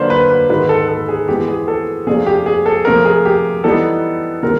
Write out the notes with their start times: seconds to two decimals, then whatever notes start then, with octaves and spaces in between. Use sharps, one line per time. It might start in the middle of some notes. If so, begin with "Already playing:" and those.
Already playing: D3 F#3 A#3 D4 F4 B4 C5
0.10 B4
0.30 B4
0.50 G#2 D#3 G#3 B4
0.69 A4
0.88 A4
1.08 G#4
1.28 E3 G#3 B3 G4
1.48 G#4
1.68 A4
2.07 C3 F3 A3 D4 F4 G#4
2.26 G4
2.46 G#4
2.66 A4
2.85 C3 F3 A3 A#4
3.05 G#4
3.25 G4
3.64 E3 G3 B3 D#4 A4
4.43 C3 D#3 G#3 C4 A#4